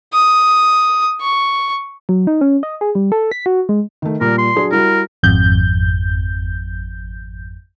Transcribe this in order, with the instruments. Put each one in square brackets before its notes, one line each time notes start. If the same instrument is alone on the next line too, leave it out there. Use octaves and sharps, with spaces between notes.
[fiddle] D#6
C#6
[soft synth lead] F#3
D#4
C#4
D#5
G#4
G3
A4
B6
F#4
G#3
[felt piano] D#3 A3
[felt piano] A#2 G3 [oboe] A#4
[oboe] C6
[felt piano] F#3 D4 G#4
[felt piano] G3 E4 F#4 [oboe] A#4
[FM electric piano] G#1 F2 G6